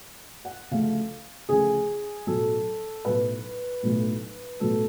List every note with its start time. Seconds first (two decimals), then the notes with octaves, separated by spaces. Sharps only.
0.45 F#5
0.71 D2 C#3 F3 A3 C#4 F5
1.49 D2 C#3 F3 A3 C#4 G#4
2.27 B1 A2 F#3 A3 A4
3.05 B1 A2 F#3 A3 B4
3.83 B1 A2 F#3 A3
4.60 B1 A2 F#3 A3 A4